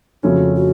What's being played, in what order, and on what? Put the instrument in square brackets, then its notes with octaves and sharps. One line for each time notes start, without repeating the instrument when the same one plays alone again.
[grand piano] F2 C#3 F3 A3 C#4 [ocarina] F#4
[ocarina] F#4